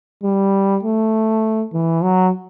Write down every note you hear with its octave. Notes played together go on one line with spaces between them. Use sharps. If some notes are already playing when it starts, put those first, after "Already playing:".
G3
A3
E3
F#3